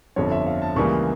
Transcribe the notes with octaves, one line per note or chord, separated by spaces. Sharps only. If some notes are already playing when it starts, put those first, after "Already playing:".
G1 F2 D3 F3 C#5
E5
F5
A5
C#2 C#3 E3 G3 A#3 C#6